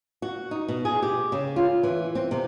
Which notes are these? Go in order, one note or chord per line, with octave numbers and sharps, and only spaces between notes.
F#4
D#4
B2
G#4
G4
C#3
F4
E3
C4
C3